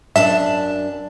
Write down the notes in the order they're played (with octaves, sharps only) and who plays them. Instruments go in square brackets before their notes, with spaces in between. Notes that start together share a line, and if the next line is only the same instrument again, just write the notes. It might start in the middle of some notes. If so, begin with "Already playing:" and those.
[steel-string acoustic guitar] F#2 D4 A5 [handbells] E5